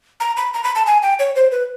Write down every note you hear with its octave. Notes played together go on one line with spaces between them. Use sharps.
A#5
B5
A#5
B5
A5
G#5
G5
C#5
C5
B4